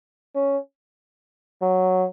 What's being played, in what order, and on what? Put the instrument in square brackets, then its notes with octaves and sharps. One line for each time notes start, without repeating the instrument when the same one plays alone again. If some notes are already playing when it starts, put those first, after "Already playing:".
[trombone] C#4
F#3